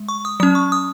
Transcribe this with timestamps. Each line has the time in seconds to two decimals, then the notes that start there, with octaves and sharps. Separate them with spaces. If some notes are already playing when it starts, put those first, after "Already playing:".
Already playing: G#3
0.09 C#6
0.25 D#6
0.40 F#3 C#4 D#6
0.55 C#6
0.72 D#6